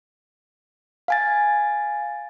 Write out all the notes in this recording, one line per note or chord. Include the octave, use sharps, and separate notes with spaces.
F5 G#5 A6